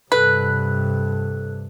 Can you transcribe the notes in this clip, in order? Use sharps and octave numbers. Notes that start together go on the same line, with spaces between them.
G2 C3 A4 B4 F#6